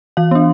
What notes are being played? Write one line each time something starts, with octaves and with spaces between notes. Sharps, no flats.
E3 F5
B3 D4